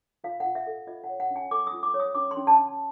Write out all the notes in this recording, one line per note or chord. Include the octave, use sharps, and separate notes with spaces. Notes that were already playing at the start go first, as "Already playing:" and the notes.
F4 F5
F4 F#5
E5
A4
F4 D#5
F#5
C#5
F#5
C#4
G#5
A4 D6
D#6
F4
D6
C#5
D#6
C#4 D6
C6
C#4
A5
C#4